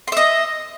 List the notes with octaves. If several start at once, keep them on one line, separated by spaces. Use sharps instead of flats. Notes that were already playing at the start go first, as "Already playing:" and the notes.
D#5 E5 C6